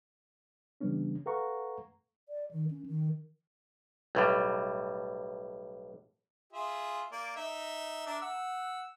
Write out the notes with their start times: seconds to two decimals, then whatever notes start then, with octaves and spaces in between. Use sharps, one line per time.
0.81 C#3 E3 G3 B3 C#4 D4
1.26 A4 B4 F5 F#5 A#5 C#6
2.28 D5
2.51 D#3
2.71 C#4
2.86 D#3
4.15 B1 A2 G3
6.53 F4 G#4 E5
7.11 A#3 D5
7.36 D#4 E5
8.07 D4 A#4 E5
8.22 F#5 E6